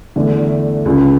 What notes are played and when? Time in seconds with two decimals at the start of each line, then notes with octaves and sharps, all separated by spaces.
0.16 E2 D3 A3
0.85 C#2 C#3 G#3